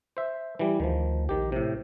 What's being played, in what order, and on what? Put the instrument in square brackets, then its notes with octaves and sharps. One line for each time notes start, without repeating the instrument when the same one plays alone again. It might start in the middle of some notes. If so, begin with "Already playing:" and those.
[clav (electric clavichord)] C5 E5
E3 G3
[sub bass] D2 [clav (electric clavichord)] D#3 F3
[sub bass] A#1 [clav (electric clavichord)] D#3 G4
[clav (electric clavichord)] A2 C3